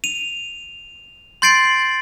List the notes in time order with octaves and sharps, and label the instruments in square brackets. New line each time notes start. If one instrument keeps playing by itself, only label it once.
[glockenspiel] D#7 F7
C6 G6 A6 C7 D7 F#7